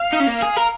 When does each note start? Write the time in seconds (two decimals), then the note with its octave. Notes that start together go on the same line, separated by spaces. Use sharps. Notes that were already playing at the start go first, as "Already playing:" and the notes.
Already playing: F5
0.13 D#4
0.20 C#4
0.27 A#3
0.42 G#4
0.56 A#4